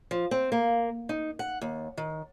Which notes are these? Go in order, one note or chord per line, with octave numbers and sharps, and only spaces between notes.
F3
C4
A#3
D#4
F#5
D#2
D#3